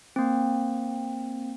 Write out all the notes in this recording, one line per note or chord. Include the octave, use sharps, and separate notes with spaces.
A#3 C4